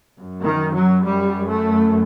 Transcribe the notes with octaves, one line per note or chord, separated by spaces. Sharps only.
F#2
D#3
F#3
G3
A3